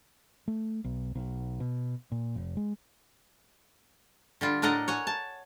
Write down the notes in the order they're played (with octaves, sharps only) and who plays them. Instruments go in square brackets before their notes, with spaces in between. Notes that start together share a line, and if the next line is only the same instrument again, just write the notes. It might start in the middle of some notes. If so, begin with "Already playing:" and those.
[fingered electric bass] A3
B1
B1
B2
A#2
F1
G#3
[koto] D3 G3 F4
A2 D4 A#4 D#5 F#5 A#5
C#5 F#5 G#5
A5